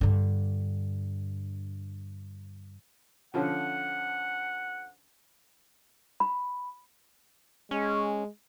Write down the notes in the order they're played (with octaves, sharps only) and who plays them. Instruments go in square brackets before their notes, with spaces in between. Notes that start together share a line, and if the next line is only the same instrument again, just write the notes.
[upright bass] G2 D3
[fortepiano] D3 F3 C#4 [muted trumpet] F#5
[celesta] B5
[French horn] G#3 [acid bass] C#4